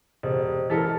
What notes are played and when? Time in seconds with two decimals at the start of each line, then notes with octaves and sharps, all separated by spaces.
0.23 E1 G4 C5 D#5
0.70 E3 A4 A#4 A6 B6
0.85 A5